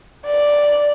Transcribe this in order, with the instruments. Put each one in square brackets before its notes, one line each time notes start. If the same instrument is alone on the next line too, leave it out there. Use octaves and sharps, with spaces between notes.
[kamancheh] D5